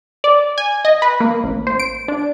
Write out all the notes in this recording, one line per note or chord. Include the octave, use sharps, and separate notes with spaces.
D5
G#5
D#5
B4
A#3
A1
C5
D7
D4